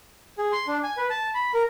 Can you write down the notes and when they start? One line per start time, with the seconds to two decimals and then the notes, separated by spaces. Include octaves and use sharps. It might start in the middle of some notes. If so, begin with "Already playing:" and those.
0.38 G#4
0.52 C6
0.67 D4
0.83 G#5
0.97 B4
1.10 A5
1.34 B5
1.54 A#4